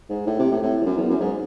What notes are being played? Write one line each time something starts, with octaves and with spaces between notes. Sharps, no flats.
G#2
A2
C3
A2
A2
E2
F#2
E2
F#2
G#2